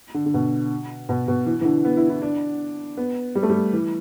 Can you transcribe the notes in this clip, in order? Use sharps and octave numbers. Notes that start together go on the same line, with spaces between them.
D3
D3
B2
B2
B2
E3
E3
D3
B3
E4
E4
D4
B3
G3
A3
G3
E3